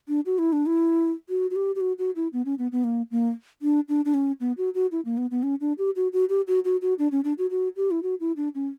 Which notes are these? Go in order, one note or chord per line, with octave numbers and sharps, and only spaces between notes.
D4
F#4
E4
D4
E4
F#4
F#4
G4
G4
F#4
F#4
E4
B3
C#4
B3
B3
A#3
A#3
D4
D4
D4
C#4
B3
F#4
F#4
E4
A#3
B3
B3
C#4
D4
G4
F#4
F#4
G4
F#4
F#4
F#4
D4
C#4
D4
F#4
F#4
G4
E4
F#4
E4
D4
C#4